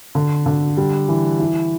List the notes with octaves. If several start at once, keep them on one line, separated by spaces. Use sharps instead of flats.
D3
D3
G3
E3
E4